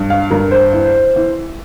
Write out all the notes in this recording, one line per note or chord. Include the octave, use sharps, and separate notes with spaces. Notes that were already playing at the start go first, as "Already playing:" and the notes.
Already playing: G2
F5
G2 A#4
C5
E3
E3